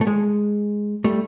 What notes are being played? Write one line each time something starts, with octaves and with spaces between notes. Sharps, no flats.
A3
G#3
G3 A3